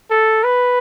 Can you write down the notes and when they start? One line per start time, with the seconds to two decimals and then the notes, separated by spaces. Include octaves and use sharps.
0.10 A4
0.44 B4